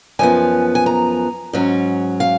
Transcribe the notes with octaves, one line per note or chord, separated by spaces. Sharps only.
F#2 F3 B3 G#5
G#5
A#5
G#2 F#3 C#4
F5